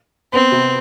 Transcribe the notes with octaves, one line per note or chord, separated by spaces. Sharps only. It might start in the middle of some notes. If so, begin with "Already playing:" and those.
B3 C4
C3